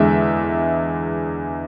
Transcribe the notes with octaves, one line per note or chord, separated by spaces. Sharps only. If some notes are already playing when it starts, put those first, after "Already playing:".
Already playing: E2 D3 G#3 E5